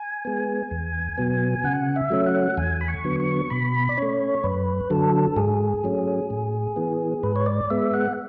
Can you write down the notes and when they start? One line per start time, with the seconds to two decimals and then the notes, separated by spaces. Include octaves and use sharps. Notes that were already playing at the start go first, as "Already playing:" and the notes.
Already playing: G#5
0.25 G#3 B3
0.71 E2
1.17 B2 F#3 B3
1.64 C#3 F#5
1.96 E5
2.10 F#3 A3 C#4
2.26 F#5
2.57 E2 G#5
2.81 B5
2.88 C#6
3.04 D3 F#3 B3
3.20 C#6
3.50 B2 B5
3.89 D5
3.97 A3 C#4 C#5
4.43 F#2 B4
4.90 D3 F#3 A4
5.36 G#2 G#4
5.84 F#3 A3 C#4
6.30 A2
6.76 E3 B3
7.23 G#2 B4
7.36 C#5
7.46 D5
7.70 G#3 B3 E5
7.94 F#5